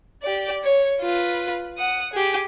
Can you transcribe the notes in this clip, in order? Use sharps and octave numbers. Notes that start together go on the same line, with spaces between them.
G4 D5
C#5
F4 B4
F#5 D#6
G4 G#4